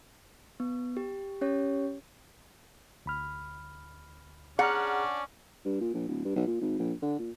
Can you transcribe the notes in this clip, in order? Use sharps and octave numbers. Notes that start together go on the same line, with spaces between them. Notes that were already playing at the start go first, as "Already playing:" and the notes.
B3
G4
C#4 G4 C#5
D2 B5 F6
C#4 D4 G#4 F#5 A#5 F6
G2
A#2
A#1
D1
G2
B1
A#2
G#1
A#1
D3
A#2